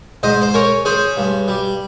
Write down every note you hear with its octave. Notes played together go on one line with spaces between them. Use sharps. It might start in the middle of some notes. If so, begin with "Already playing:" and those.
G#2 C5 D#5
C5
C#4 A#4 C#5
C#4 G#4 C5
G2
G3